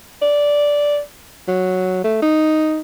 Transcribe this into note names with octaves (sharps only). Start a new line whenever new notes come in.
D5
F#3
A3
D#4